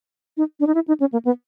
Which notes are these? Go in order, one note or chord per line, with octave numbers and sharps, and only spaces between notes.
D#4
D4
D#4
E4
D#4
C#4
A#3
B3